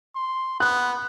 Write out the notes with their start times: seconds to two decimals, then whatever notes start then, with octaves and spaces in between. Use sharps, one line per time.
0.16 C6
0.60 B3 F#6